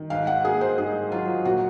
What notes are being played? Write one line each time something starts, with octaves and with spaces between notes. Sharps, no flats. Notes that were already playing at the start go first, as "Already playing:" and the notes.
Already playing: D#3
G#2 F5
F#5
A#3 G#4
C5
G#2 G#4
F#3 F4
A#2 F#4